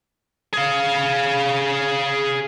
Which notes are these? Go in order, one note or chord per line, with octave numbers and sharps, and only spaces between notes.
G#4 F5